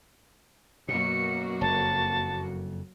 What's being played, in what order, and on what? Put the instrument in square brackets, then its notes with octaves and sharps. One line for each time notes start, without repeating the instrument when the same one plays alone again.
[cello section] F#2 A#3 F#4 [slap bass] B2 [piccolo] C#7
[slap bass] F#1 F2 [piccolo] A5